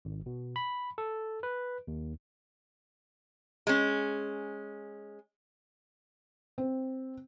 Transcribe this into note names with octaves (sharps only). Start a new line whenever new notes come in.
G#1
B2
B5
A4
B4
D#2
G#3 C#4
C4